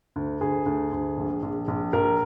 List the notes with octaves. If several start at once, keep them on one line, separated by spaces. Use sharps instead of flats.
D2
D2 G#4
D2
D2
A#1
A#1
A#1
A#1 A#4